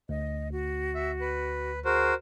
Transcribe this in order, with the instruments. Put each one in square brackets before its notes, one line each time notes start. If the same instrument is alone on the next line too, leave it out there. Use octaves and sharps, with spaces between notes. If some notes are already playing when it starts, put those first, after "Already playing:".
[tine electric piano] D2 [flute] D#5
[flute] F#4
[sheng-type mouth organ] E5
B4
[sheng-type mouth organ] F#4 A#4 C5 [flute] G#4